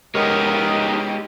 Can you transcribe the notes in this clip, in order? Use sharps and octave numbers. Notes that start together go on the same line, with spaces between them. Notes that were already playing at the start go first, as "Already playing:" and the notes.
G#3 B3 D#4 G4 A#4 C#5 D#5